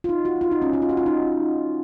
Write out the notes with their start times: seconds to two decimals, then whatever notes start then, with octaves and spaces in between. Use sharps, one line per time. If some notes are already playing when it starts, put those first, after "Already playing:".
0.04 F4
0.09 D#4
0.25 F#4
0.41 F4
0.51 D#4
0.62 C#4
0.73 D#4
0.82 F4
0.89 F#4
0.97 F4
1.06 D#4